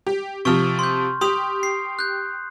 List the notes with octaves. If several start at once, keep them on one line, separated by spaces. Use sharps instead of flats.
G4
C3 F3 C#6 F6
C6 G6
G4 C6 D#6 F7
C7
F#6 G6